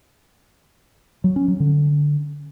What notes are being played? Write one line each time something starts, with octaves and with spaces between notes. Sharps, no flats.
F#3
C#4
F#3
D3